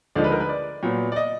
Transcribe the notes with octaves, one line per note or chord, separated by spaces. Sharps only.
D2 D3 F3 G#3 D#4 D5
B4
A#4
B4
D5
A#2 F#3 B3
D5
D#5